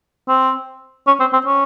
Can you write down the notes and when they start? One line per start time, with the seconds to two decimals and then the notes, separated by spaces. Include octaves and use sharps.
0.28 C4
1.07 C#4
1.20 C4
1.33 C4
1.46 C#4